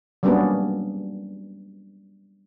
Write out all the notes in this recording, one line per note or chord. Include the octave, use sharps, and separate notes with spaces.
F#3 G3 A#3 B3 C#4 D4